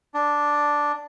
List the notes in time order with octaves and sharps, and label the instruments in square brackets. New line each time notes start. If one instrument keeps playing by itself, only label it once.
[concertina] D4